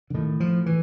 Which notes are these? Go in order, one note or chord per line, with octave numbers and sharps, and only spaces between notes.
D3
A2 D#3
F3
E3